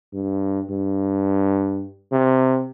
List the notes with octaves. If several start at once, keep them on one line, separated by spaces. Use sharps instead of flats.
G2
G2
C3